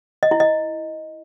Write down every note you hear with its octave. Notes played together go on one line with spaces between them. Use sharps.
D#5
E4
D#5